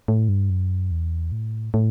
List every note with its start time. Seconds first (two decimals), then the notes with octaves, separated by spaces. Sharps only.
0.08 A2
0.29 G2
0.50 F#2
0.91 E2
1.32 A2
1.74 A2